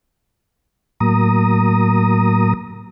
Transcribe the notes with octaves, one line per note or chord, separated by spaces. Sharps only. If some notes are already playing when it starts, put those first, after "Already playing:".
A2 F#3 A#3 A#5 D#6